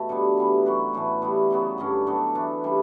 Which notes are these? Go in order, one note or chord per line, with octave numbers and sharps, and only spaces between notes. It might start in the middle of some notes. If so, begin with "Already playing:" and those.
Already playing: B2 A3
D3 G3 B3
E3 G3 B3
F#3 C#4 F#4 B4
A2 E3 A3
G3 B3 E4
C#3 F#3 B3
G2 D3 F#3 C#4
F#3 B3 D4 A4
E3 A3 D4
C#3 G3 D4